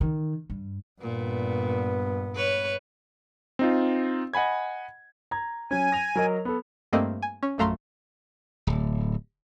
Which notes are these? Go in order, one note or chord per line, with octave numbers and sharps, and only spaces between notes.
D#3
G2
G2 A#2 B3
B4 C#5
C4 D#4 F4
D#5 F#5 G#5 B5 G#6
A#5 G#6
F#3 C#4 G#5
A#6 F7
F#3 A#4 D#5
B3 A4
G2 A3 A#3 C4 D#5
G#5
C#4
A#1 F#2 A3 F5 A#5 C6
D1